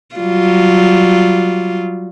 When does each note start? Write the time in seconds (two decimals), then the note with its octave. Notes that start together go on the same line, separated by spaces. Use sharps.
0.16 F#3 G3 F4